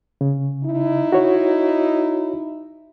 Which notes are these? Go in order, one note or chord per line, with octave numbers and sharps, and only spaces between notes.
C#3
D#4 E4
F#4 C#5